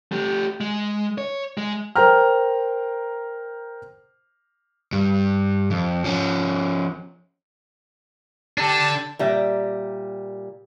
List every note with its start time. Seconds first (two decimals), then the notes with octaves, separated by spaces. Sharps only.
0.12 A3 G4
0.61 G#3
1.18 C#5
1.58 G#3
1.96 A#4 C5 G5 A#5 F6
4.93 G2
5.71 F2
6.04 F3 C#4
8.58 D4 G4 A4 A5
9.19 A#2 G3 E5